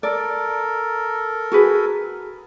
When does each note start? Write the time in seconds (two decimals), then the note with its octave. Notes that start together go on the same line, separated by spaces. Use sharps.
0.03 A4 A#4 D5
1.52 F#4 G#4 B4